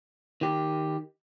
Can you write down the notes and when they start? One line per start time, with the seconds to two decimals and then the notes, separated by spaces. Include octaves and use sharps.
0.41 D#3 G4